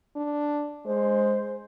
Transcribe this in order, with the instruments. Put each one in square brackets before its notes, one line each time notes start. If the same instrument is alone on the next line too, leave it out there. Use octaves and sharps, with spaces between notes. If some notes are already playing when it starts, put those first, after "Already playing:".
[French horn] D4
[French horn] G#3 [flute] C5